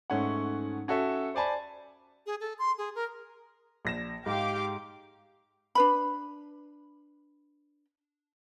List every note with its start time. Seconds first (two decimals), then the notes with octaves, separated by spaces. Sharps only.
0.10 G#2 A3 C#4 C#5 F#5
0.88 C#4 F#4 A4 E5
1.35 C5 D5 G#5 A5 B5
2.26 G#4
2.40 A4
2.59 C6
2.78 G#4
2.95 A#4
3.85 A#1 A#6 E7
4.26 G#2 G4 F5 D6
5.75 D4 B4 B5